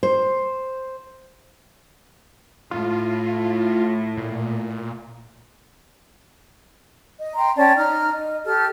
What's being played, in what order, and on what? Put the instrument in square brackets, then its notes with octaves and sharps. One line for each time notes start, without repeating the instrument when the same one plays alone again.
[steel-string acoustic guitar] C5
[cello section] A2 [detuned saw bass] F4
[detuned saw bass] A#2
[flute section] D#5
G5 A#5 C6
C#4 D5 G5 A5
D#4 A#5 F6
D#5
G4 A4 F6